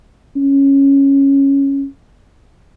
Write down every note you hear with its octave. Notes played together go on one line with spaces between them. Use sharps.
C#4